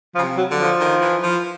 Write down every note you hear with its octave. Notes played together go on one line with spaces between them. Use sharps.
F3
C#3
C3
F#3
D3
F3
D#3
E3
F3